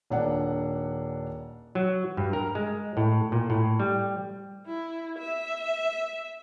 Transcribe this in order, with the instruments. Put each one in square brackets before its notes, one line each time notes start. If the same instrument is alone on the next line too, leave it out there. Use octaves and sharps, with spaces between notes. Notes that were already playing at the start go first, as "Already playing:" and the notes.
[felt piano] D#1 D4 F#5
[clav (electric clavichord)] F#3
G2
A#4
G#3
A2
A#2
A2
G3
[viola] E4
E5